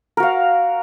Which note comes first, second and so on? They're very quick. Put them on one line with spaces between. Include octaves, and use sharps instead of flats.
A#4 F#4 F5